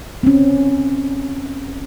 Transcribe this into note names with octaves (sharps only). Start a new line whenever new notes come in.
C4 C#4